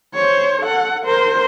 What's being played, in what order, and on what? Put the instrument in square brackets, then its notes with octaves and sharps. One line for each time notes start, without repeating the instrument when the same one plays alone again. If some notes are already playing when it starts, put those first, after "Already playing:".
[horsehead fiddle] C5 C#5
A4 F#5
A#4 C5